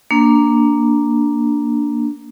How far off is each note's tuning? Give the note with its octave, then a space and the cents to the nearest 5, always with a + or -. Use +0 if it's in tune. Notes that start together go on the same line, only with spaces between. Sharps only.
A#3 +0 D4 +0